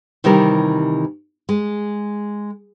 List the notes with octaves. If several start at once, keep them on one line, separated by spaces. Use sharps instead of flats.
C3 D#3 E3 G3 A#4
G#3